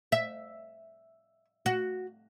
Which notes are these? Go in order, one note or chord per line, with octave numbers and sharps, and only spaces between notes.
E5
F#4